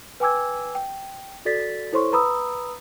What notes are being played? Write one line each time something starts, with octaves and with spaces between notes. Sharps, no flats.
B4 G5 G#5 D6 E6 G#6
G5
F#4 A4 D5 A6 B6
E4 A4 C5 C#5 C6 C#6
B4 A#5 B5 D#6 E6